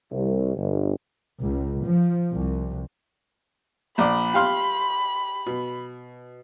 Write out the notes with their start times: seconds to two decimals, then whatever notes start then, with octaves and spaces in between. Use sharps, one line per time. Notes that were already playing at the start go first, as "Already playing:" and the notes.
0.12 C2
0.56 G1
1.41 C#2
1.85 F3
2.31 C2
3.98 A#1 D5 B5
4.34 G4 F5 C6
5.46 B2